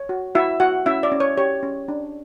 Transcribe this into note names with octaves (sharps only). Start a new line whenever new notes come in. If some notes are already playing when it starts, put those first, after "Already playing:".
Already playing: C#5
F#4
E4 F#4 E5
F#4 F#5
C#4 E4 E5
D5
C#4
C#5
G4 C#5
C#4
D4